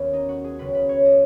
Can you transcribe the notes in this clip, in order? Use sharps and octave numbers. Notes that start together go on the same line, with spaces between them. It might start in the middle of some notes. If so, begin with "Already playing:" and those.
Already playing: D#2 F#3 B3 C#4
D#4
F#4
G#4
C#2 C#3 F#3 B4
B4
C#5
D#5